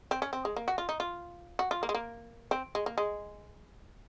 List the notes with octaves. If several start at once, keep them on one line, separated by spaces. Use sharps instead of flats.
C4
C#4
C4
G#3
A#3
F#4
F4
D#4
F4
F#4
F4
A#3
G#3
A#3
C4
G#3
A#3
G#3